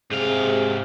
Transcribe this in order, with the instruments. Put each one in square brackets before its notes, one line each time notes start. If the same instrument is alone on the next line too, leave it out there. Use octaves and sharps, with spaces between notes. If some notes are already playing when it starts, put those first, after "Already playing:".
[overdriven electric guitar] G#2 F5 [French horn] C3 [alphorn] G#4